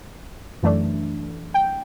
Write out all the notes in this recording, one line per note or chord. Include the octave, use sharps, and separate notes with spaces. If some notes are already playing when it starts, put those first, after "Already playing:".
F#2 E3 A3 D4
G5